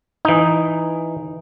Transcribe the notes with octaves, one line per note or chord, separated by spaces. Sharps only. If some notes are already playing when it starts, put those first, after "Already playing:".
E3 D#4